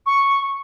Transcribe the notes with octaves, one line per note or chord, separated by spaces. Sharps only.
C#6